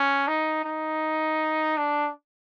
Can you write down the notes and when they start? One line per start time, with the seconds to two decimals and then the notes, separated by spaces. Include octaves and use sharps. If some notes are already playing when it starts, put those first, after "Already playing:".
Already playing: C#4
0.28 D#4
0.64 D#4
1.77 D4